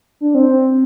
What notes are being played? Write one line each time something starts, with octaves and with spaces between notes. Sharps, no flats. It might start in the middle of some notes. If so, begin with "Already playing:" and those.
D4
C4